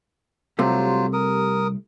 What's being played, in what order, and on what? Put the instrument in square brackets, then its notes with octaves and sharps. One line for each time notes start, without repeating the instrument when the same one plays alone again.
[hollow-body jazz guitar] C2 C3 A3 [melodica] F#3 F4 C5
[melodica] A#4 D#6